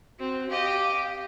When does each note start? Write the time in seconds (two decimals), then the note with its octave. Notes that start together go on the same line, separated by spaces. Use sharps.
0.19 C4 F#4
0.50 G4 D#5 F5